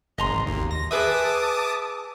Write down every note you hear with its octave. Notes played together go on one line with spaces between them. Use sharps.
G#1 D#5 A#5 C6
D#2
A#6
G#4 B4 E5 A5 D6 D#6